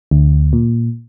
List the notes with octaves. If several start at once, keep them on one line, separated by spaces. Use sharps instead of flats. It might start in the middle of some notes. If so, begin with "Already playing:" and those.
D2
A#2